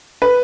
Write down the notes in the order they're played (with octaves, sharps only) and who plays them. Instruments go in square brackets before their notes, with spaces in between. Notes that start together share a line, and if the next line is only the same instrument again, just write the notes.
[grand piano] B4